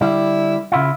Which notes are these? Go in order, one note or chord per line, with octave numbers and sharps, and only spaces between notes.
D3 G3 E4
C#3 E4 F4